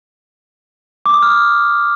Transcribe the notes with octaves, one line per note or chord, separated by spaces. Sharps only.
D6
D#6
F6
D#6